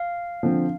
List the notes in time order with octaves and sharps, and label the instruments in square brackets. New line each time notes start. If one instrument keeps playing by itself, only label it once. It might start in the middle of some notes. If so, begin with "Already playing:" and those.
Already playing: [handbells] F5
[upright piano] D3 F3 C4